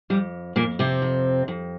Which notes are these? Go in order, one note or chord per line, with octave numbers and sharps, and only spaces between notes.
F2 G3
F2 A#2 A#3
C3 C4
F2
F2